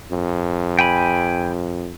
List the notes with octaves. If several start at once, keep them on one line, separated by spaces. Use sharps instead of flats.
F2
G5 G#5 B5